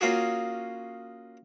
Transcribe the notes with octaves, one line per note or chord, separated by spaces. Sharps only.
A#3 C#4 F4 F#4 G#4